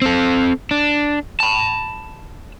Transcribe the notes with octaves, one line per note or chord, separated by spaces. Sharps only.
C4 A4
D4
A5 B5